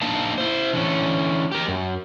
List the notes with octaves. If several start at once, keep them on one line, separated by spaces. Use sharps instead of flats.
A#3 D4 D#4 A#4 F5 A5
E4 C5
D3 E3 C#4
G4 A#4
F#2